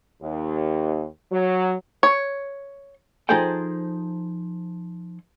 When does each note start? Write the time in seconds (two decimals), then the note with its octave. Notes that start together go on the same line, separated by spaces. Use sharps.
0.22 D#2
1.32 F#3
2.03 C#5
3.29 F3 D#4 G#4 A4 C5 G5